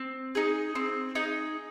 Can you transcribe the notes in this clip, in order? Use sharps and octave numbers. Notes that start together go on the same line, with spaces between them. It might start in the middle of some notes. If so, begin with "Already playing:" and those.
Already playing: C4
D#4 G#4
C4
D#4 G#4